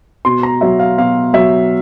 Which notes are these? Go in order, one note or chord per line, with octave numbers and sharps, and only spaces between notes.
B2 C6
A#5
F#3 E5
F5
B2 F5
F#3 E5